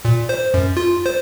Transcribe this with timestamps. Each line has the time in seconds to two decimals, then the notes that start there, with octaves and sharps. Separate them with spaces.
0.05 A#2
0.29 C5
0.54 F#2
0.77 F4
1.06 C5